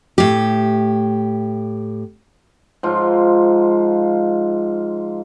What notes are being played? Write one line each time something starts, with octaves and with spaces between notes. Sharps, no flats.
A2 G4
G#2 F3 F4